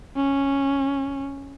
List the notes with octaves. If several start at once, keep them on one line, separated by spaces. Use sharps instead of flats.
C#4